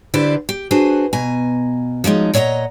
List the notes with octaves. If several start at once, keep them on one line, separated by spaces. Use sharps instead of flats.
D3 E4 G4 B4 C5 D5
G4
D4 F#4 G#4 B4 C5
B2 G#5 A#5
F3 F#3 G#3 D#4
A#2 C#5 D#5 F#5 A#5